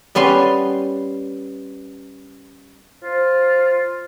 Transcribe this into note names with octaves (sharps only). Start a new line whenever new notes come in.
G3 B3 C#4 C6
F4 C5